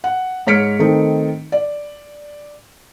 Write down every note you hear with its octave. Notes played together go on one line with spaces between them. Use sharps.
F#5
G#2 C#5 F6 B6 C#7 D7
D#3 A3 C4 D#4
D5